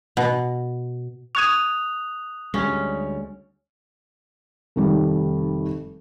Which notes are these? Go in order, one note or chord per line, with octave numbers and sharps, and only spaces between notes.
B2
C#6 D#6 F#6 G#6 D#7 F7
D2 G3 G#3 C#4
F1 D#3 G3